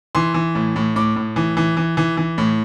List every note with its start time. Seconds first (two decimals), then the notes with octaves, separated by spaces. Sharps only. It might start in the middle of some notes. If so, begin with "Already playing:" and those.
0.15 E3 C6
0.34 E3
0.55 A2
0.76 A2
0.96 A2 D6
1.16 A2
1.36 E3
1.57 E3
1.77 E3
1.97 E3
2.17 E3
2.38 A2